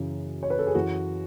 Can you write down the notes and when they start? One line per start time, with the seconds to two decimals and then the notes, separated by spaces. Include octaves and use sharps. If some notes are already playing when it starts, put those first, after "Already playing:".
Already playing: F#2 C#3 E3
0.43 C#5
0.50 B4
0.59 A4
0.67 G#4
0.75 F#2 E3 F#4